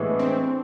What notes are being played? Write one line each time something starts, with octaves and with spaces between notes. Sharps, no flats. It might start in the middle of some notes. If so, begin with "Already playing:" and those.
Already playing: A2 E3 G#3 B3 D4 E4
C4